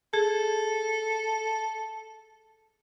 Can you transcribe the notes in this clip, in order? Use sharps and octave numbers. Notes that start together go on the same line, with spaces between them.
G#4 A4